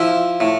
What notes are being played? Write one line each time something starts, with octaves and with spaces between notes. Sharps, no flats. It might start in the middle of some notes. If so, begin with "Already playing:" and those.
Already playing: F3 E4
A2